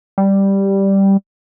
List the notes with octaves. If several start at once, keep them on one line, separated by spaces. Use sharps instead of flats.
G3